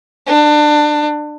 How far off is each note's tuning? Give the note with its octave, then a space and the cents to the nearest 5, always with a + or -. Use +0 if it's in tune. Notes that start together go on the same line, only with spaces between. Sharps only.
D4 +25